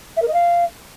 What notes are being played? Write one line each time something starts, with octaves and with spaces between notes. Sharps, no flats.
E5
A#4
D#5
F5